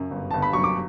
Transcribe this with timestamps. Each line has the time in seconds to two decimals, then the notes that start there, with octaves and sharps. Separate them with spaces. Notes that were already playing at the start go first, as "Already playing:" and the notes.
Already playing: F#2 C#3 F#3
0.11 G1
0.31 G1 A5
0.42 B5
0.53 F#3 C#6
0.64 D6